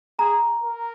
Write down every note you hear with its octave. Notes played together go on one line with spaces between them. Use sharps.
G#4 A#5
A#4